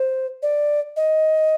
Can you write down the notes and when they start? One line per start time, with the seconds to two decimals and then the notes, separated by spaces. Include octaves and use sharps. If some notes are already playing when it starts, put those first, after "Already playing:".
Already playing: C5
0.43 D5
0.96 D#5